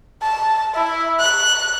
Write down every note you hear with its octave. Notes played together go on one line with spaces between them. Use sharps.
A5
E4
F#6